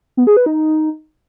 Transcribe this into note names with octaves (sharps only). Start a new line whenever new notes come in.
B3
G#4
B4
D#4